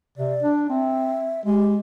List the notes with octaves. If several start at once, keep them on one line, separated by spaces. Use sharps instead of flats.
C3 D5
D4
C4 E5
G#3 G4